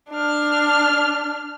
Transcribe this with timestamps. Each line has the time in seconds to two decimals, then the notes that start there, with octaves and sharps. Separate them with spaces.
0.10 D4 F6